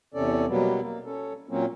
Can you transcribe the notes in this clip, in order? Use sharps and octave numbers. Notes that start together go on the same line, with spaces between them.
E2 C3 C#4 A4 D5
B2 F#3 G3 A#3 B3
A#3
C#4 A4
A#2 F#3 A#3 C4 C#4